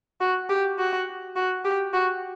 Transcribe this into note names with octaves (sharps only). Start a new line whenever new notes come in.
F#4
G4
F#4
F#4
G4
F#4